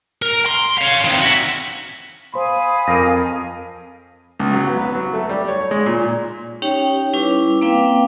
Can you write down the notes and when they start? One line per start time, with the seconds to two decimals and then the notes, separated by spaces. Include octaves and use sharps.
0.22 A#4
0.46 C6
0.78 C#5 F5
1.05 C3 D#3
1.21 F#4 E5
2.34 C5 F5 G#5 B5 C6 D#6
2.87 F2 A#4 A#6
4.39 C#2
4.53 F#3
4.67 B3
4.81 B4
4.95 F#3
5.13 A3
5.29 G3
5.48 C#5
5.71 G#3
5.86 A#2
6.62 C#4 D#4 G4 C#5 G5
7.13 G3 C#4 E4 B4 D6
7.61 A#3 C4 B4 F5 G5 D6